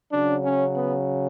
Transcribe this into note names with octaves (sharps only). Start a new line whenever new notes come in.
C#3 F#3 D4
C#4
B3